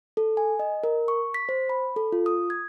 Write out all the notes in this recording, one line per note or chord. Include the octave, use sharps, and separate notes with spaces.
A4
G#5
D#5
A#4
C#6
B6
C5
B5
A4
F4
D#6
G#6